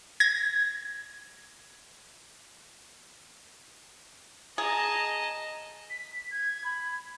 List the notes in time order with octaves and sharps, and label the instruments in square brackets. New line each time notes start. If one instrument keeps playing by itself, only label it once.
[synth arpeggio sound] G#6 A#6
[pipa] G#4 [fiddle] D#5 A5 [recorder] A#5
[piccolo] B6
G#6
B5